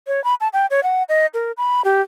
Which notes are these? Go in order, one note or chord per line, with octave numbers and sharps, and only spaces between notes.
C#5
B5
A5
G5
C#5
F#5
D#5
A#4
B5
G4